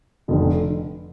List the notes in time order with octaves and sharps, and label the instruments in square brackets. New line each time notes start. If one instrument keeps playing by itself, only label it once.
[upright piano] F1 F2 D3